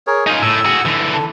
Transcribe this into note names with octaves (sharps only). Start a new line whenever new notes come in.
G#4 A#4 C#5
D#4 F4 G#5
A2 E6
F#4 G#4
D3 E3
A4